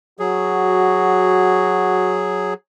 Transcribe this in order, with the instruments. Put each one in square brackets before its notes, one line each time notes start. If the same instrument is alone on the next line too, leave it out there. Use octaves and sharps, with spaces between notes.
[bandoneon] F#3 G#4 [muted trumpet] F#4